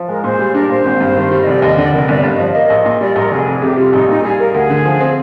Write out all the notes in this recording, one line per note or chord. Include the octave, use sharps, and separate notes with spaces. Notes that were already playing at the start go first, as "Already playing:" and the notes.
Already playing: F3
G#3 A#4
A#2 C5
G3
D4 A#4
A#2 C5
G#1
G2
D#3
G3
D#5
F1 D5
D#2 D#5
D3 D5
F1 A#4
G1 D5
G2
D#5
F3 D5
A#3 D#5
A#1
A#2
G3 D5
A#1 A#4
F1 G#4
F2
C3 G4
G3 F4
A#1 D#4
A#2 D#4
G3 G#4
A#3 A#4
D2 G#4
D3
F3
C4